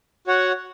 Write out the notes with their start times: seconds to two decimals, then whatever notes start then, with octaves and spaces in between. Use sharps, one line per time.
0.27 F#4 C#5 F#5